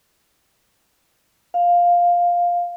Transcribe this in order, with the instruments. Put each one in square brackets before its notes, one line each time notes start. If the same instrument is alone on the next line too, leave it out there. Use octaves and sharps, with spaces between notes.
[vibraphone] F5